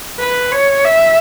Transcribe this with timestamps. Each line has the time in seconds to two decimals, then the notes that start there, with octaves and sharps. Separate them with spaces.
0.20 B4
0.52 C#5
0.84 E5